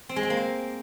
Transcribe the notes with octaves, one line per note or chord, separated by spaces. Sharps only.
C4
G#3
C4
A#3
C5